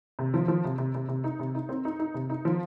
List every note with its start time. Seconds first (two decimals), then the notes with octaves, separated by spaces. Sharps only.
0.19 C3
0.34 F3
0.48 F3
0.65 C3
0.78 C3
0.95 C3
1.09 C3
1.24 D#4
1.39 C3
1.55 D#4
1.69 C4
1.85 D#4
1.99 D#4
2.14 C3
2.30 D#4
2.45 F3